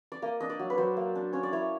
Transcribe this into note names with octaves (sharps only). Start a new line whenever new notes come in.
D5
A#3 D#5
D4 D#5
D5
F#3
B4
F#3 C5
A#3
D4
C#4 C#5
D5
E4 C#5